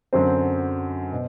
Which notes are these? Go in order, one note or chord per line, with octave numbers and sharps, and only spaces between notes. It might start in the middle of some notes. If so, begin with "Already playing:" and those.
F#2 D3 F#3 C4 C5
B2